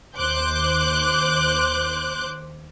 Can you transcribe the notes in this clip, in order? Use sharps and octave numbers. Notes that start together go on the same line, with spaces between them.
D#2 C5 D6 F#6 G6